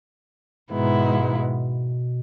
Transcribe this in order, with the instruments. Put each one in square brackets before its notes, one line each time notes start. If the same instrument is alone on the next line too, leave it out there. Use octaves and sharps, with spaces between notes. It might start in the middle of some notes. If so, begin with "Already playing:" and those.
[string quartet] G#2 D#3 G#3 B3 E4 [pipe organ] B2